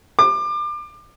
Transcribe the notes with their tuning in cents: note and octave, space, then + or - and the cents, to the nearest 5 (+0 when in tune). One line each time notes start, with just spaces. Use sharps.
D6 +30